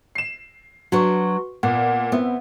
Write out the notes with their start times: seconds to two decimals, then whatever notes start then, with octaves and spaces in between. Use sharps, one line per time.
0.15 C7 E7
0.92 F#3 D4 F#4 B4 C#6
1.63 A#2 B3 F#5
2.12 B3 C4 E4